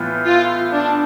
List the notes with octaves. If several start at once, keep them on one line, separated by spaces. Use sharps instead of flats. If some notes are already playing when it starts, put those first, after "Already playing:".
Already playing: A2 E3 B3 F4
F4
D4